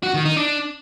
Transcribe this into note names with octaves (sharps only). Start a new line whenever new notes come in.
F#4
D#3
D#4
D4